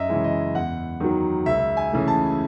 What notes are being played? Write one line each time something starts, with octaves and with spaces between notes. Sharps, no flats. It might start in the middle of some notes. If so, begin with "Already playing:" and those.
Already playing: F#2 D#5 E5
C#3 E3 G#3
D#5
E2 F#5
D#3 F#3
C#2 E5
G#5
C#3 E3 A3
A5